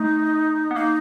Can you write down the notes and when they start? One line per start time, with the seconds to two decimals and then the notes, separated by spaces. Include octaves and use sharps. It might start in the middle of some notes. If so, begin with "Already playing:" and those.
Already playing: A3 D#4
0.71 B3
0.75 A#3 D#4